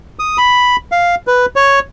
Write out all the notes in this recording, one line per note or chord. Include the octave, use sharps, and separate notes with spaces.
D#6
B5
F5
B4
C#5